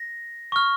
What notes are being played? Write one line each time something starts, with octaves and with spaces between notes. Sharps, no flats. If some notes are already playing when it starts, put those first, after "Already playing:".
Already playing: A#6
C#6 F6